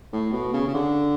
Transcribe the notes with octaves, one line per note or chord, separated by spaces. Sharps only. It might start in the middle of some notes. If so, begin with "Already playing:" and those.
A2
B2
C#3
C#3
D3